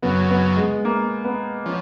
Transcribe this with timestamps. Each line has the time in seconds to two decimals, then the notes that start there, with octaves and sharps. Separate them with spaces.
0.02 F#2 C#3 F#3 B3
0.30 B3
0.56 G#3
0.85 A#3
1.25 B3
1.65 F3 C#4